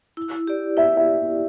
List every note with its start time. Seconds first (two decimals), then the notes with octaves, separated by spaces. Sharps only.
0.17 E4
0.47 G4 D5
0.77 E4 E5
0.97 E5